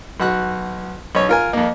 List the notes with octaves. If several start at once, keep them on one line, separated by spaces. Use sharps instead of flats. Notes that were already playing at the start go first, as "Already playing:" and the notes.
B1 F#4 F#6
B1 C#4 C#5
F4 A#4 G#5
F2 A#3